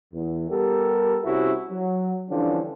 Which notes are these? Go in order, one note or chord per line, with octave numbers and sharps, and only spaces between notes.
E2
G3 B3 G4 A4 A#4
C2 C3 C#4 E4 F#4
F#3
D3 E3 F3 G3 C#4 D4